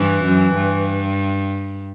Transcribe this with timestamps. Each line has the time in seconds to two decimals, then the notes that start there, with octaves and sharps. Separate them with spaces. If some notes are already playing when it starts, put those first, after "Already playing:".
Already playing: G2 E3
0.24 F#2
0.55 G2